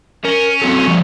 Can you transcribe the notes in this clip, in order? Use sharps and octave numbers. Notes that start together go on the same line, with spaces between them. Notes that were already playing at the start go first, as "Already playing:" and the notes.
C#4 A#4
C4 F#4 A4
F3 G3 G#3